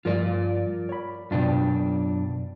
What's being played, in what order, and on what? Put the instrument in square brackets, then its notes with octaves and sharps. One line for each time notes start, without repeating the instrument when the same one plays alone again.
[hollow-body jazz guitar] G2 F3 [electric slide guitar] F4 A#4 D5
[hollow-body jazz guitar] C#5 B5
[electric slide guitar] F#2 D4 G5 [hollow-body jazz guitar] B2 F4